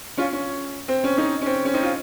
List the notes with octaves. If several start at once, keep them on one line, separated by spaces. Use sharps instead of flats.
C#4 F4
C#4
C4
C#4
C4 D#4
C#4
C4
C#4
C4 D#4
F4